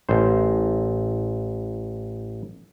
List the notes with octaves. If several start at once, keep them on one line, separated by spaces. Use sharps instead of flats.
A1 C5